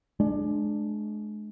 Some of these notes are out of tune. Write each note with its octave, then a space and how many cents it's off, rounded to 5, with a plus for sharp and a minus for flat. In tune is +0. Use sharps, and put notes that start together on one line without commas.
G#3 +35 D4 +15